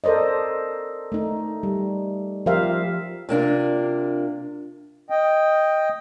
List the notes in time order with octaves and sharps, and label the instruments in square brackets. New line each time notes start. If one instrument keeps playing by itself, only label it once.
[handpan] A4 A#4 C5 D5 D#5
A3 D#4
G3
F3 G4 A#4 C5 E5 F5
[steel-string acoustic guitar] C3 A#3 D4 F4
[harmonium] D#5 G5